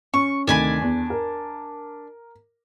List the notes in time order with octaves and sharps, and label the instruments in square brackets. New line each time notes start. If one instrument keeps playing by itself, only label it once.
[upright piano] C#4 [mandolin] C#6
[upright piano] D2 C3 D#3 [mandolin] D4 G#5 B5
[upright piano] E2
A#4